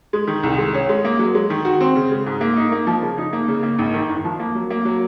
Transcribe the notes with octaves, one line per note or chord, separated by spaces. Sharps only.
G#3
D#3
C2
G#3
C#4
G#3
A#3
F#3
G#3
D#3
F#4
C4
C#3
G#3
G#2
A#3
D#4
A#3
F3
C#3
D#4
A#3
C#3
A#3
G#1
D#3
F#1
F3
A#3
F#3
A#3
F#3